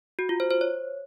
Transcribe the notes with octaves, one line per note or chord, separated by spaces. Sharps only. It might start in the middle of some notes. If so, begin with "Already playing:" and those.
F#4
F4
C5
C5
C#5